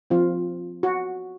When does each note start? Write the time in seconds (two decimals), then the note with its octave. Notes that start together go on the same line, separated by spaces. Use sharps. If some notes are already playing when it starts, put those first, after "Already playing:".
0.10 F3 C4 F4
0.83 F#4